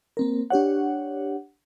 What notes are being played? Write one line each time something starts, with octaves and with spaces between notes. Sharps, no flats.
A#3 C4 A#4
D4 G4 C#5 F#5